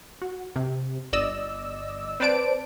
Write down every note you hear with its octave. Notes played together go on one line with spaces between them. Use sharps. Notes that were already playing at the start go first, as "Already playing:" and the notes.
F#4
C3
G1 D5 D#5 E6
C4 B4 C5 D5 A5 D7